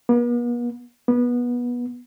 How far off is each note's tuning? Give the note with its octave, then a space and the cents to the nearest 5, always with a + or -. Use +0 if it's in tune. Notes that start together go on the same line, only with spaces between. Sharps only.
B3 -45
B3 -20